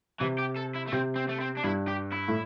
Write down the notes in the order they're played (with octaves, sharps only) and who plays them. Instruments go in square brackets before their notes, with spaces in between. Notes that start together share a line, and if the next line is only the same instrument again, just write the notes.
[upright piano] C3 [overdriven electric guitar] E3
[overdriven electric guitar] G4
A4
E4
A3
[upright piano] C3 [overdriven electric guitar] C4
[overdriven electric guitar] C4
A3
C4
D4
[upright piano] G2 [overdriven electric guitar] E4
[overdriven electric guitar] G4
E4
[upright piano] A2